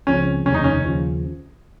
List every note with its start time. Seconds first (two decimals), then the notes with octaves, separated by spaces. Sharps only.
0.07 C#2 C#3 F3 C4 C#4
0.46 F1 D#2 C#3 C#4
0.54 D#4
0.64 C#4
0.84 D#2 C#3 F3